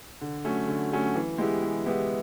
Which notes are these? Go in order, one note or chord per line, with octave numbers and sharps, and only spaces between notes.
D3
F#3 A3 C#4
D3
F#3 A3 C#4
E3
G#3 B3 E4 G4
E3
G#3 B3 E4 G4